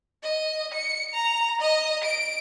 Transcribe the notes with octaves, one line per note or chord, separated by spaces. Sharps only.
D#5
C#7
A#5
D#5
D7